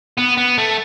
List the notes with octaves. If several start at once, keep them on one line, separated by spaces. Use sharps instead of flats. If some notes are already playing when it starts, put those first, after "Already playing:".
B3
B3
A3